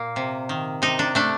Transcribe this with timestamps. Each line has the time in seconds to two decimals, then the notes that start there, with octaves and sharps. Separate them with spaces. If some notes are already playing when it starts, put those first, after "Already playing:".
Already playing: A#2 A#3
0.16 C3
0.49 D#3
0.82 C3 D#4
0.99 D4
1.15 A3 D4